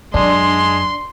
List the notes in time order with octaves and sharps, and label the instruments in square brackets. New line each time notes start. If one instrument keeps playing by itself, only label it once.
[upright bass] F#2 [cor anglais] G#3 [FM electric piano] D4 [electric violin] C6